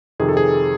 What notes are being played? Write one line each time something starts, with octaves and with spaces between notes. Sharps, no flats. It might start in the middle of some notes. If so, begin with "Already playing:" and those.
F2 C3 D#3 G#4
A4
G#4